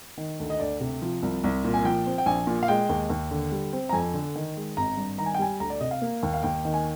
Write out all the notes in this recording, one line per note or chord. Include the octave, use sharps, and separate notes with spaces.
D#3
D2
D#5
D2 D5
C3
F3
C2
C2
A#2
G#5
F3 G5
C4
G5
A#1 G#5
A#2
F5
G#3 G5
D#2
D#2
D3
G3
C4
A#5
F2 G#5
D3
D#3
G#3
G#1 A#5
G2
D#3 A#5
G#5
G5
G3 G#5
D2 A#5
D5
C3 D#5
F5
A#3
D#2
F5
D#2 G5
D#3
G#5